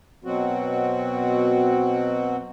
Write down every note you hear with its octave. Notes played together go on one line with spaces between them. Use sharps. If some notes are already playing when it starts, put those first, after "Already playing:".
B2 F#3 C4 F#4